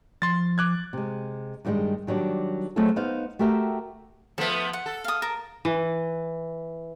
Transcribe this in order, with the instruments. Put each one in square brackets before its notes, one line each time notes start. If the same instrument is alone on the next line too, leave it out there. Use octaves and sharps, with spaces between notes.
[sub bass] F3 [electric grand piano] C6 A6
[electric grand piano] D6 F#6 G#6
[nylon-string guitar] C3 G#3
G2 D#3 F3 G3 G#3
D#3 F#3 G3 C#4 D4
F#3 A3 C4 F4 G#4 A4
B3 D#4 C5 F5
A3 F#4 G4 A#4 E5 G5
[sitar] F3 A3 B3 [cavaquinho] A4 E5
[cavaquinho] F#5
[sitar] A4
[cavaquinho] F5 D#6
A#4 A5
[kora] E3